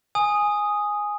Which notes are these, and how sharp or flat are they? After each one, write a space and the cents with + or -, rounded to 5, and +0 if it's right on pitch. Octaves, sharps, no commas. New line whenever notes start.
G#5 +0 D#6 +0